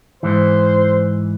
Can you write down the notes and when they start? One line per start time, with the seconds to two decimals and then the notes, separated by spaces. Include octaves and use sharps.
0.23 G#2 E3 C5